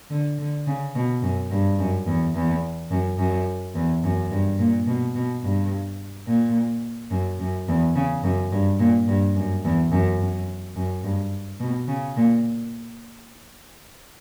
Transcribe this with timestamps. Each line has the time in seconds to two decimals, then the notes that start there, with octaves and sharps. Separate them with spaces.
0.10 D3
0.38 D3
0.67 C#3
0.95 B2
1.22 F#2
1.51 G2
1.79 F#2
2.07 E2
2.35 E2
2.90 F#2
3.18 F#2
3.75 E2
4.03 F#2
4.31 G2
4.59 A#2
4.87 B2
5.15 B2
5.43 G2
6.27 A#2
7.11 F#2
7.39 F#2
7.68 E2
7.95 C#3
8.23 F#2
8.52 G2
8.79 A#2
9.08 G2
9.36 F#2
9.64 E2
9.91 F#2
10.19 F#2
10.76 F#2
11.04 G2
11.60 B2
11.88 C#3
12.16 A#2